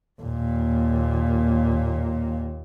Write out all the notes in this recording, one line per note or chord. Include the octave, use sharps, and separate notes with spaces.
D#2 A#2